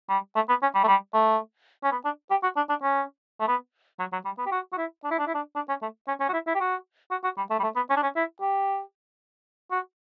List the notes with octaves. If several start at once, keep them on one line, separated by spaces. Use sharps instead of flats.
G3
A3
B3
C#4
G3
A3
G3
A3
C#4
B3
D4
G4
F#4
D4
D4
C#4
A3
B3
F#3
F#3
G3
B3
G4
F#4
F#4
E4
D4
E4
D4
E4
D4
D4
C#4
A3
C#4
C#4
F#4
E4
E4
G4
F#4
F#4
F#4
G3
A3
G3
A3
B3
C#4
D4
C#4
E4
G4
F#4